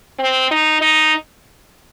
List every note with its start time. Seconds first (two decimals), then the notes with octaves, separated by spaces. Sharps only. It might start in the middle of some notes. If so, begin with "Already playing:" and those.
0.19 C4
0.51 D#4
0.81 D#4